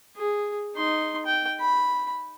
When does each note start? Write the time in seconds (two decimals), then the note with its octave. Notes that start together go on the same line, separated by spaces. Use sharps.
0.16 G#4
0.76 D#4 C6
1.26 G5
1.60 B5